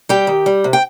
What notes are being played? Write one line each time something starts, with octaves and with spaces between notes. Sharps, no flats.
G3 G4 G5
D#3
G3
C3
G5